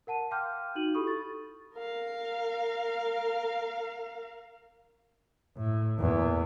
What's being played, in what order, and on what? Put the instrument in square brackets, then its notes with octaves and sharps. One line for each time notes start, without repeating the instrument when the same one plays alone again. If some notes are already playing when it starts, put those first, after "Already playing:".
[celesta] A#4 F#5 A5 D#7
F5 G5 C6 D6 F6 G6
D#4 F#4 D#7 F#7
E4 G4 A4 B5 C#6 D#6
A6
[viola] A#4 F5
[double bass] A2
E2 A#2